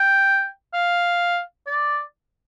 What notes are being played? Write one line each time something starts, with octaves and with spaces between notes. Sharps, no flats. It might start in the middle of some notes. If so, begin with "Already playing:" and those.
Already playing: G5
F5
D5